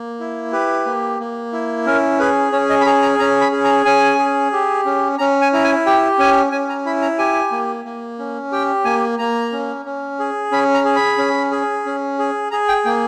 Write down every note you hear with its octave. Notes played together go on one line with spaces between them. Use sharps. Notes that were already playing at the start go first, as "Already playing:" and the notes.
Already playing: A#3
E4
G4 B4
A#3
A#3
E4
C#4 A#4
G#4 B4
C#4 C#5
D#5
B5
G#4 A#5
A#5
C#4 A#5
B5
G#4
A#5
C#4 G#5
G#4
G4
C#4
C#4 A#5
G#5
E4 A#5
G#5
G4 G5
C#4 G#5
C#4 G#5
A#5
E4 B5
A#5
G4 G#5
A#3
A#3
C#4
G4 G5
A#3 G#5
A#3 A#5
C#4
C#4
G#4
C#4 B5
A#5
G#4
B5
C#4
G#4
C#4
G#4
G#4 A#5
G5
A#3 G5